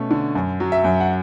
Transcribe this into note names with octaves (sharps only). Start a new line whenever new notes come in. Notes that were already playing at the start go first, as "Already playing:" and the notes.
Already playing: B2 A3 C#4
D3
F#2
F#3
E5
F#2
F#5